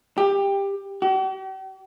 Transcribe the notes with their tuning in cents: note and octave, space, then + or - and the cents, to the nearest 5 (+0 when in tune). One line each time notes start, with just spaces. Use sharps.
G4 +15
G4 -45